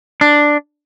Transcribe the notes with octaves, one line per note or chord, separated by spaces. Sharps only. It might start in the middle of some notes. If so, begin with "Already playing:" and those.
D4